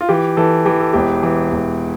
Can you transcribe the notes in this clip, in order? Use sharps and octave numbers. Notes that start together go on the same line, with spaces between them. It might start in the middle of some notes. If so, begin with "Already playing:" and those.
F4
E3 G4
E3 A4
E3 G4
A4
E1 G4
E3
E1